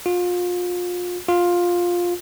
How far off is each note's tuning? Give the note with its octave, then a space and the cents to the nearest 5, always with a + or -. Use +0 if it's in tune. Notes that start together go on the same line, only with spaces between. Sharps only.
F4 +30
F4 +10